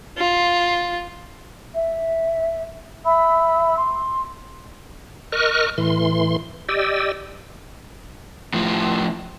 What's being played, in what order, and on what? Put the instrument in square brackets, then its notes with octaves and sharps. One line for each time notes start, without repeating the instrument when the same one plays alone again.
[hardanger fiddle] F4
[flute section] E5
E5 B5 E6
C6
[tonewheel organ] A#4 D#5 C#6 F6 F#6
A2 E3 C6
G4 D5 D#5 E6
[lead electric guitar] A2 F3